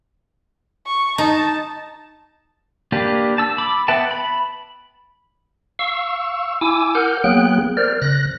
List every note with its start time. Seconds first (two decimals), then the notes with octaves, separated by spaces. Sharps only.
0.86 C#6
1.18 D#4 A5
2.92 A#3 D4 G4 B4
3.38 A5 E6
3.58 B5 D6 E6
3.88 B3 B4 E5 G5 A5
4.11 B5
5.79 F5 C#6 E6
6.61 E4 G#5 D6 E6
6.95 A#4 F#5 F6 G6
7.24 F#3 A#3 B3 G#4 G5 F#6
7.77 A#4 C5 D5 F6
8.02 C#3 F#6 A#6